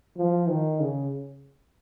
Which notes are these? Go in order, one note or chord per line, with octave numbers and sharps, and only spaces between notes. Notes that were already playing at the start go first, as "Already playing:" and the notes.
F3
D#3
C#3